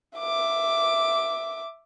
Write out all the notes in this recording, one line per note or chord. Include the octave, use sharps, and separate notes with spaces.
E5 D6